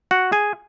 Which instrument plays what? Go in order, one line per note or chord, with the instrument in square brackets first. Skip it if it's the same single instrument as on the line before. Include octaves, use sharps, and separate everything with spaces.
[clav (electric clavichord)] F#4 F#5
G#4 G#5